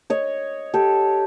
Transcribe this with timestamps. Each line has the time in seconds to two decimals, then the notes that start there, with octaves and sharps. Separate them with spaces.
0.10 C#5 D#5
0.74 G4 A4